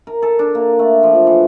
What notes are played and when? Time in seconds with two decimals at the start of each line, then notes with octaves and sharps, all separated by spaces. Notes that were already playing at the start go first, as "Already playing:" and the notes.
0.07 A#4
0.22 A4
0.39 D4
0.55 A#3
0.79 A3
1.03 F3
1.15 F3
1.27 E3